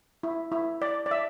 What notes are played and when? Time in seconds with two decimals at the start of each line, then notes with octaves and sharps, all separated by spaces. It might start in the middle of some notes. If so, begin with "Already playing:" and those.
0.23 E4
0.52 E4
0.82 D5
1.06 D5
1.11 E5